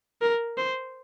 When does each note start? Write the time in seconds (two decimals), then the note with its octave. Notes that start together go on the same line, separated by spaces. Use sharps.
0.22 A#4
0.58 C5